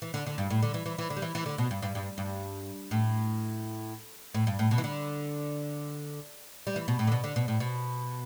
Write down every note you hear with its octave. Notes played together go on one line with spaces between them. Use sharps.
E3
D3
D3
G2
A2
D3
E3
E3
E3
D3
G3
E3
E3
D3
B2
G2
G2
G2
G2
A2
A2
G2
A2
B2
E3
D3
G3
E3
B2
A2
D3
B2
D3
B2
A2
B2